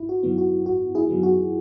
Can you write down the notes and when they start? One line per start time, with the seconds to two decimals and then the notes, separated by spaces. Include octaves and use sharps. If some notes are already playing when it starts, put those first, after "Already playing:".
Already playing: G#1 E4
0.09 F#4
0.23 F#2 D#3 F#3 B3
0.38 F#4
0.66 G#1 F#4
0.95 E4 G#4
1.09 F#2 D#3 F#3 B3
1.23 F#4